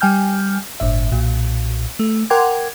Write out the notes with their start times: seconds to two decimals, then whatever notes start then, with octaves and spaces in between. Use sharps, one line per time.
0.01 G3 G5 G#5 F6 G6
0.80 G1 A2 E5
1.12 B1 A#2
1.99 A3
2.30 A#4 F#5 G5 C6 D6 G#6